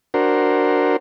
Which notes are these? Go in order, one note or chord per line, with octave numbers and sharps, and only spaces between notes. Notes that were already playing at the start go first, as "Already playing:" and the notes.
D4 F#4 A#4 C5